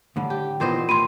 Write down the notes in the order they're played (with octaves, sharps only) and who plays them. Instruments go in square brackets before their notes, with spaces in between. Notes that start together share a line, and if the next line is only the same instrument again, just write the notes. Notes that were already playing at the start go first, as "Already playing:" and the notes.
[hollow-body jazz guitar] A2 D3 G3
[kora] G4
[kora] A#2 C5 D#5 [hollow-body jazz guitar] D#3 E3 B3
[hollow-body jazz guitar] A2 G4 [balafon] B5 C6 [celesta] D#7